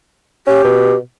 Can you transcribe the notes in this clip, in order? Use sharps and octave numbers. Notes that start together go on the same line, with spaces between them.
C#4 G4
B2